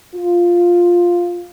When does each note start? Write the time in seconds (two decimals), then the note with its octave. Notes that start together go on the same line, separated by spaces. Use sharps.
0.15 F4